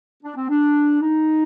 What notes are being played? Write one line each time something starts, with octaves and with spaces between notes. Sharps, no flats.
D4
C4
D4
D#4